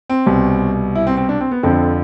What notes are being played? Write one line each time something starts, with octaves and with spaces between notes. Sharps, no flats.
C4
C2 B2
E4
C4
C4
D4
C4
B3
F2 D3 F3 C4